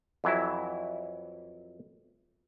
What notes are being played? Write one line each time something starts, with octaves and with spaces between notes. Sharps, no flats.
F2 E3 F#3 E4